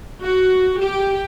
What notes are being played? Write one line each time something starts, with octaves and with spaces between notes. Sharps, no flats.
F#4
G4